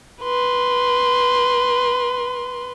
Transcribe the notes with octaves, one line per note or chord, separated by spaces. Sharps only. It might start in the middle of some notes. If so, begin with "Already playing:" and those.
B4 C6